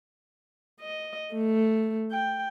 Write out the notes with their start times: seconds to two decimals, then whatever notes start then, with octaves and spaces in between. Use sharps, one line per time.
0.80 D#5
1.34 A3
2.11 G5